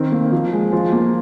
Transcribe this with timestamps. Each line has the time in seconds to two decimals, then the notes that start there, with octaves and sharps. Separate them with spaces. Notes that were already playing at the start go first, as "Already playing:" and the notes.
Already playing: D#3 C4 A#4
0.12 A#3
0.32 F3
0.53 G#3
0.73 F3 F4
0.93 A#3